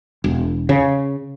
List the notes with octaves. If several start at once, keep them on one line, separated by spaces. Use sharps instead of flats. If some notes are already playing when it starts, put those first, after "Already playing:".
E1
C#3